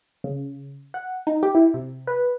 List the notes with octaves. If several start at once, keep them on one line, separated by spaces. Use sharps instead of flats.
C#3
F#5
D#4
G4
E4
C3
B4